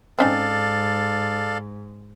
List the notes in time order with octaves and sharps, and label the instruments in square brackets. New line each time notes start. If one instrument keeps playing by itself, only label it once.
[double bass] G#2 [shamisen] C4 C#4 D#4 [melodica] A4 D5 F5